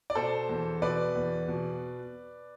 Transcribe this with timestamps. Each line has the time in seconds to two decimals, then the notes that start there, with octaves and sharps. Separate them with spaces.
0.10 D5
0.15 B2 A4 C5
0.49 E2
0.82 B2 B4 D5
1.16 E2
1.48 B2